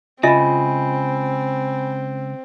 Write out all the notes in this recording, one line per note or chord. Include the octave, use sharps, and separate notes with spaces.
C#2 C#3 C4 F4 D#5 E5 G#5 B5